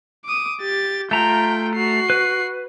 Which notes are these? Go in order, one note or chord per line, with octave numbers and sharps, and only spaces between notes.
D6 D#6
G4 A6
A3 F4 G5 A#5
F#4 C7
B4